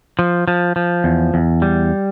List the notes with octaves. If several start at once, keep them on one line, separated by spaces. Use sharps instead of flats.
F3
F3
F3
E2
E2
G3